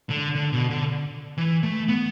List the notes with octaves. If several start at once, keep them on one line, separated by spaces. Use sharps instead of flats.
D3
D3
B2
D3
E3
A3
B3